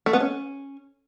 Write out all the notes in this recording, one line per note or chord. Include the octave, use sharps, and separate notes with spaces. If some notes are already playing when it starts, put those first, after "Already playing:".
A3
B3
C#4